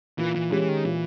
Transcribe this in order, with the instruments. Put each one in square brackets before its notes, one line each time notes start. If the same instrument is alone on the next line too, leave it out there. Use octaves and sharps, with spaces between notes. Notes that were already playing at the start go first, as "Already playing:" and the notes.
[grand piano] A#2 [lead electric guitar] E3
[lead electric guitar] E3
[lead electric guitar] E3 [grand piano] G#3 C#4 G4
[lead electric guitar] D#3
[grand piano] A#2 [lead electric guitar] E3